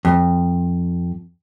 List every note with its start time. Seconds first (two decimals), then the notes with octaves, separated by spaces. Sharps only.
0.05 F2